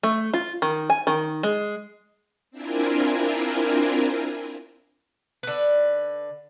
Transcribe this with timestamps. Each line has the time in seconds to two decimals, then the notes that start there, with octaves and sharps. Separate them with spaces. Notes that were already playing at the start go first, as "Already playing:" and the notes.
0.03 A3
0.34 F4
0.62 D#3
0.90 G#5
1.07 D#3
1.43 G#3
2.51 C4 D4 E4 F4 A#4 G#5
5.43 D3 B4